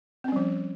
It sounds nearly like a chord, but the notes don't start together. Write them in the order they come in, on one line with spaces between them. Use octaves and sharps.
C4 C#4 G3 F3